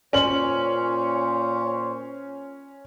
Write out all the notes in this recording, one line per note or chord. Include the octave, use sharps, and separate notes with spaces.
A#2 C#4 C5 C#5 F#7